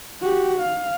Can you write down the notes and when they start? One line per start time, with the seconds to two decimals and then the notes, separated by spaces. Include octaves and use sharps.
0.22 F#4 G4
0.59 F5